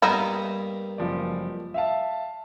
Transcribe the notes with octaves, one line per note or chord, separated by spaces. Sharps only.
G2 A#3 B3 D#4 E4 D#6
F#1 F3 D5
E5 F5 A5